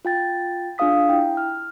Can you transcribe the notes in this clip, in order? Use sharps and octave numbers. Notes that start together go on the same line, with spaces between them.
F4 G5 A6
D4 F4 G#4 F5 D#6 B6
E4 G5
F6